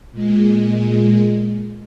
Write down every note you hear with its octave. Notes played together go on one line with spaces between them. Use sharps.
A#2 G#3